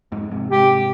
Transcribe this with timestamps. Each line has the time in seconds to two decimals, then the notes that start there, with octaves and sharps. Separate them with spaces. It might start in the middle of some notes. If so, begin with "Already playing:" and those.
0.12 F2 G#2
0.31 G#2 C3
0.51 G#2 C3 G4